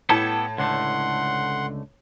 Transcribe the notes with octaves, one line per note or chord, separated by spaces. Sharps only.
A2 B3 G4 A4 A5 G#6
C#2 D3 A3 F#5 C6